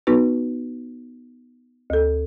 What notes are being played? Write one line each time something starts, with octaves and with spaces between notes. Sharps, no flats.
B3 D#4 F#4 B4
D2 A4